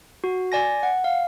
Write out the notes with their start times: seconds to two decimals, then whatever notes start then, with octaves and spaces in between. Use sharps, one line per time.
0.24 F#4
0.52 D5 G#5 A#6
0.83 F#5
1.04 F5